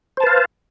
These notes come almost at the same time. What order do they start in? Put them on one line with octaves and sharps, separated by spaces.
C5 A5 B4 F5